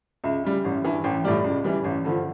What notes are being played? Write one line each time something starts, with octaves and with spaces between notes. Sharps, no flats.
C#2 E5
C#3 G3
A1
G2 E3
A1 G5
A2 G3 D5
C#2
C#3 E3 G3
A1
G2 D3 F3